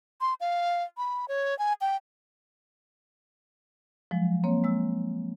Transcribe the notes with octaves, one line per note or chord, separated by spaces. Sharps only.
C6
F5
B5
C#5
G#5
G5
F3 F#3 G#3
A#3 C4 C#5
G#3 E6